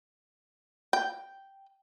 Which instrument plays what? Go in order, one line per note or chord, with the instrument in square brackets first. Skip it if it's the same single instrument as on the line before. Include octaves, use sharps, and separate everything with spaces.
[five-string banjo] G5